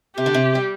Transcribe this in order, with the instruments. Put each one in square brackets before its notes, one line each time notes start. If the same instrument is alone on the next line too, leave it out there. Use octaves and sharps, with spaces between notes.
[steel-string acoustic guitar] C3 [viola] G4
[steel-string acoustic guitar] D3
C3
G3